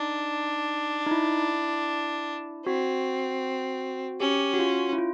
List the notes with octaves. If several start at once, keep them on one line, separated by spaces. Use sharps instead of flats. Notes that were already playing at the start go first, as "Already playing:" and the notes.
Already playing: D4 D#4
D#4
E4
C4 F#4
C#4 G4
F#4
F4
E4
F4